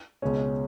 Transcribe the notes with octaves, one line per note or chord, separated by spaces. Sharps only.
C#2 B2 G#3 C#4